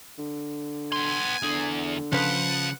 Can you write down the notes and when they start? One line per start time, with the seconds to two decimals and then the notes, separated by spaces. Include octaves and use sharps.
0.18 D3
0.92 B3 G#5 C6
1.43 E2 D3 G#4
2.12 C#3 F3 B4 F#5